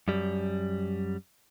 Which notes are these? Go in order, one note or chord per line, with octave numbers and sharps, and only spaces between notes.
F#2 G3